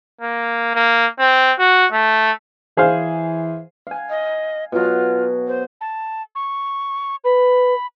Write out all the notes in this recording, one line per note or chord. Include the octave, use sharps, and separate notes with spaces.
A#3
A#3
C4
F#4
A3
E3 G#4 C5 F5
F5 G#5
D#5
B2 F#3 F4
C5
A5
C#6
B4 B5